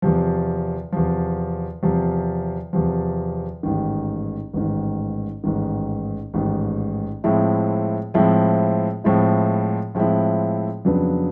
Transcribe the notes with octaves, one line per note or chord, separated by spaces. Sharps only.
E2 C3 F3
E2 C3 F3
E2 C3 F3
E2 C3 F3
A1 G#2 D#3
A1 G#2 D#3
A1 G#2 D#3
A1 G#2 D#3
A2 F3 G#3 C4 E4
A2 F3 G#3 C4 E4
A2 F3 G#3 C4 E4
A2 F3 G#3 C4 E4
F2 C#3 F#3 B3 D4